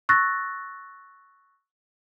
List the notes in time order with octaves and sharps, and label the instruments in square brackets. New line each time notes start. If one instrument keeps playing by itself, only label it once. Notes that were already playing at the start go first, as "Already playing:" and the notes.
[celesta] C#6 E6 F#6 A6 A#6